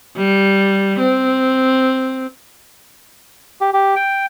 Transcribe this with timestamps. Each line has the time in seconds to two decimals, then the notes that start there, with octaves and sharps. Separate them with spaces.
0.17 G3
0.99 C4
3.61 G4
3.73 G4
3.96 G5